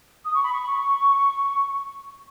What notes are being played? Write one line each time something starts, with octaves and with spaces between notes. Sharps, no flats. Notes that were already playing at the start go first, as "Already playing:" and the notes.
D#6
C#6
B5
C#6